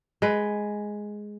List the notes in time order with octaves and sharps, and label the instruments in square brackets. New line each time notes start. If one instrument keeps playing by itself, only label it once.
[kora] G#3 B4